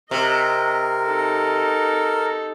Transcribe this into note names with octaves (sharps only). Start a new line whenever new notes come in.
C3 A#4 D#5
D#4 A4